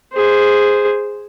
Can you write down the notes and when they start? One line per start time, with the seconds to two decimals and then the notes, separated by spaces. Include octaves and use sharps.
0.13 G#4 C5